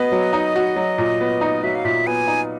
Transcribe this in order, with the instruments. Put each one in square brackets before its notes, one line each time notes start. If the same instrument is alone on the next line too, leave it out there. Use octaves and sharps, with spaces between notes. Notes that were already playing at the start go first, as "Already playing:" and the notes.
Already playing: [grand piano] B3 F#4 [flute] D#5
[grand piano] F#3
D#4
F#4
F#3
A#2
B3
D#4
[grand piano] F#3 [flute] E5
[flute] F5
[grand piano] A#2 [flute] E5
[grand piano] B3 [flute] G#5
[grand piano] D#4